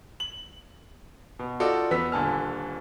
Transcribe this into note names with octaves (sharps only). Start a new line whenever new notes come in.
F#7
B2
D#4 F4 F#4 A4 D5
E2 B3 E6 B6
D#1 A#2 D3 G#5 A5 F6